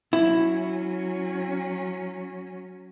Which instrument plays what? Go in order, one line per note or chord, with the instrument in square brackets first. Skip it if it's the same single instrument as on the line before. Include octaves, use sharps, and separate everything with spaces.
[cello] F#3 C#4 [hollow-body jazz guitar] E4